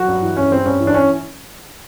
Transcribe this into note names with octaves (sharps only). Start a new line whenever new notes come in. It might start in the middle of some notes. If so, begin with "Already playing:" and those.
Already playing: F#3 F#4
G2
E3
G2 C#4
G3 C4
G2 C#4
E3
D4
C#4